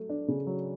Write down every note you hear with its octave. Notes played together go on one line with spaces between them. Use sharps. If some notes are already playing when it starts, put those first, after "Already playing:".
Already playing: F#3 A3
D4
C#3
F#3